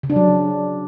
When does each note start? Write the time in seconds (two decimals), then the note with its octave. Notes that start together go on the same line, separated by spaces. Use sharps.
0.03 C#3
0.10 D4
0.16 F#3